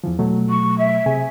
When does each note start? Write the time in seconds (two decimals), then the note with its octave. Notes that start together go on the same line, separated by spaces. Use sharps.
0.04 E2 E3 F3
0.18 B2 F#3 A3
0.50 C#6
0.79 E5
1.06 C3 G#4 G#5